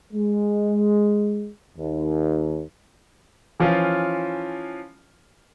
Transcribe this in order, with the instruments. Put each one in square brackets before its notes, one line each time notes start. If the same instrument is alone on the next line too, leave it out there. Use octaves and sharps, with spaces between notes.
[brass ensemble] G#3
D#2
[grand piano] E3 F3 C#4 F4